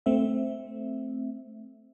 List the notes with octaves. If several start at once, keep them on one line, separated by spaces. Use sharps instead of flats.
A3 C4 E5